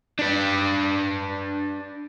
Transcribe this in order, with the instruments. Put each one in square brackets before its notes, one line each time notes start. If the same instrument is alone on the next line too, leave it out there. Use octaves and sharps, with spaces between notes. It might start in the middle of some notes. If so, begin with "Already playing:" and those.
[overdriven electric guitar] D4 B4